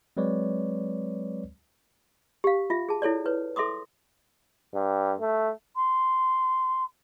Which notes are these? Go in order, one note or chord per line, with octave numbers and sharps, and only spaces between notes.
F#3 G#3 C4 B4 C#5 D5
G4 F5
F4 E5
G#4 A5
E4 A4 C#5 D5
B4 C#5
A4 E5 C6 D6 D#6
G2
A3
C6